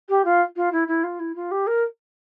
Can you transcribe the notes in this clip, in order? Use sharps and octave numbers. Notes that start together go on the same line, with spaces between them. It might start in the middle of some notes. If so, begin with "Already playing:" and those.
G4
F4
F4
E4
E4
F4
E4
F4
G4
A#4